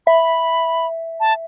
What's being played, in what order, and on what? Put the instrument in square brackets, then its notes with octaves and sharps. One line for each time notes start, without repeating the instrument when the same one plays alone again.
[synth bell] E5 [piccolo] B5
[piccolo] A5